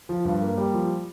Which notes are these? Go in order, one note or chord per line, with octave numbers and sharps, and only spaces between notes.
F3
G2
A#3
G3
F3